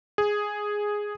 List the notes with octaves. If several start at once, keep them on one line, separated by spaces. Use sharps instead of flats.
G#4